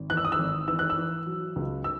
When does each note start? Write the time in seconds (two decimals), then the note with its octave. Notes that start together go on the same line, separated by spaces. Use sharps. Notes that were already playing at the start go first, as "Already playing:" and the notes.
Already playing: G#1
0.10 E3 F#6
0.17 E6
0.25 D#6
0.32 E6
0.39 G#1
0.68 E3 E6
0.79 F#6
0.90 E6
0.97 E3
1.26 F#3
1.56 C#2
1.84 E6